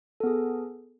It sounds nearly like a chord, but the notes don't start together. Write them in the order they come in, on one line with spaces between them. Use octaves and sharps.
A4 B3 G#4